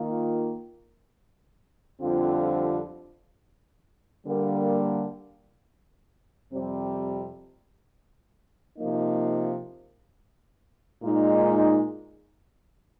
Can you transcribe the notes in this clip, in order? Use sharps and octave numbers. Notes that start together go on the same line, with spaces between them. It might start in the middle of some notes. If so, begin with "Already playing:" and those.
Already playing: D#3 A#3 F4
F2 D3 G3 C4 F4
D3 G3 A#3
F2 C3 G3 C4
C3 F3 A#3 D#4
A#2 G#3 D#4